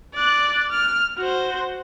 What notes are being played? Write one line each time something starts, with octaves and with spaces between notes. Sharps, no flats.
D5 F#6
F6
F#4 C5